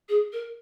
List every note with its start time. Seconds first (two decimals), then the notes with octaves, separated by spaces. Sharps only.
0.09 G#4
0.33 A#4